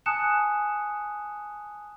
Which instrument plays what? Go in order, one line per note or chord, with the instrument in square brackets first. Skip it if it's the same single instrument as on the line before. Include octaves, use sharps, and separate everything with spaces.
[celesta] G#5 A5 D#6 F#6 C#7 E7